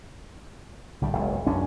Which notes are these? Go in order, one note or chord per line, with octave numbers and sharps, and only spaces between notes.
C2 D3 G3
F#1 C#2 B2
B1 F#2 C#4 D4